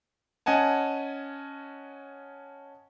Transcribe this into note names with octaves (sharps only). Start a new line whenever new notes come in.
C#4 D#5 F#5 G#5 A5